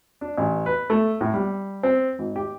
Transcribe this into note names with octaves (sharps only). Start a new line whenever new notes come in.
D4
A1
B4
A3
A2
G3
C4
G#1
G4